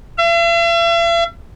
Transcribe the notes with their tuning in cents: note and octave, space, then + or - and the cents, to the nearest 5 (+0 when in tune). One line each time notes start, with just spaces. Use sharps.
E5 +45